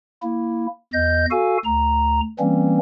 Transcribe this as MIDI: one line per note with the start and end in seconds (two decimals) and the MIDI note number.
0.23 0.67 58
0.23 0.67 64
0.93 1.26 40
0.93 1.26 75
0.93 1.26 91
1.31 1.57 66
1.31 1.57 69
1.31 1.57 77
1.31 1.57 80
1.65 2.21 38
1.65 2.21 82
2.39 2.79 52
2.39 2.79 55
2.39 2.79 58
2.39 2.79 60
2.39 2.79 61